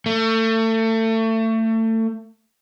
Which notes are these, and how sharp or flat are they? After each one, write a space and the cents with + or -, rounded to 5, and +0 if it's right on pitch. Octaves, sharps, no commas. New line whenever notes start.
A3 +30